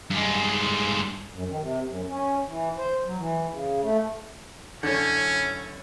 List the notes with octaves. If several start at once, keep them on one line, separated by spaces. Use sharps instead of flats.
G2 G#3
F#2
D#3
C3
F#2
C#4
E3
C5
F#3
E3
C#3
A3
F#2 D3 C#4 E4 C#5